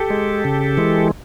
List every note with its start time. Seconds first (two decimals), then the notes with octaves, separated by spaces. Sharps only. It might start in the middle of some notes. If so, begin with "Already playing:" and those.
Already playing: G4 A4
0.10 G#3
0.45 C#3
0.77 E3 G#3